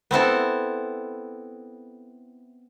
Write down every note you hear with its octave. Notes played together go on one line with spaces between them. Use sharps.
B3 C4 E4 A4